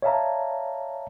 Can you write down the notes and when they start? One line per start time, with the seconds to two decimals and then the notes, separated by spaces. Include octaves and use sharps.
0.02 C#5 D5 E5 F5 A5 A#5